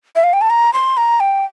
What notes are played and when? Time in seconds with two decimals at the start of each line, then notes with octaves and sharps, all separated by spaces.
0.16 E5
0.24 F5
0.33 G5
0.41 A5
0.50 A#5
0.73 C6
0.97 A#5
1.20 G5